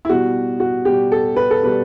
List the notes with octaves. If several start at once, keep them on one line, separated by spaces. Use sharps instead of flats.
E4
B2 G3 F#4
F#4
B2 G3 G4
A4
B4
A4
B2 G3 B4